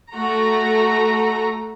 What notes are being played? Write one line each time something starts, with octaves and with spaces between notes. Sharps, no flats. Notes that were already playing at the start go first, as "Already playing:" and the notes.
A3 F#4 A#5